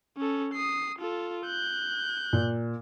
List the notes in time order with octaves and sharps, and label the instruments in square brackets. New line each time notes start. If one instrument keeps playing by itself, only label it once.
[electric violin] C#4 A4
D#6 C7
F4 A4
F#6 G6
[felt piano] A#2